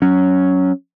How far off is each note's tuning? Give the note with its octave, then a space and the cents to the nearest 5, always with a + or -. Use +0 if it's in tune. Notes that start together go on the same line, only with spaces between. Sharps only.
F#3 +0 C#4 +0